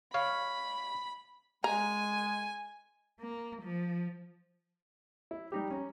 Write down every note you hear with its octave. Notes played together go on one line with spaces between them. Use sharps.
C#5 F5 B5
G#3 G#5 A#5
A#3
F3
E4
G3 D#4 G4
C#4 A#5